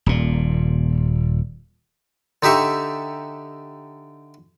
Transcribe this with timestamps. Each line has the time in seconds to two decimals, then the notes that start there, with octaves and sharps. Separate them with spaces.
0.06 D#1 A#2
2.43 D3 D#4 G4 E5 C#6